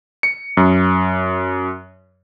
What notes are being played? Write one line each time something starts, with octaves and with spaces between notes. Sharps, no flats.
C#7
F#2